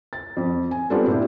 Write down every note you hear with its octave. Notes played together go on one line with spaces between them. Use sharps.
A6
F2
G#5
G3 B3 C4 D4 F4 A4
A#2 E4 G4